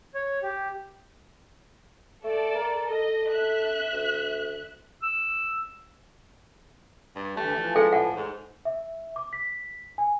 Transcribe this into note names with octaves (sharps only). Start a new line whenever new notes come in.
C#5
G4
A3 A4 D5
A#4
A4 D#5
E5 F#6
D2
E6
G2
D3 E3 A3 G4
E3 F3
G#3 A4 G5
A2 F#5
G#2
E5
D6
B6
G#5